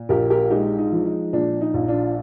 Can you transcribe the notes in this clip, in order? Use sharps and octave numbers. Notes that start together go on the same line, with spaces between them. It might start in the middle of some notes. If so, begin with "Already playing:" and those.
Already playing: A#2
A#1 G4 A#4
G4 A#4
G#3 D#4 G4
D#4
F3
D#4
A#2 D4
D#4
A#1
D4 F4